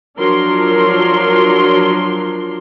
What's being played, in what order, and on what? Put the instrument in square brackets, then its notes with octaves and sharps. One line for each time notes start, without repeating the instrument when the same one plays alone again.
[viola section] F3 F#3 D4 A#4 C6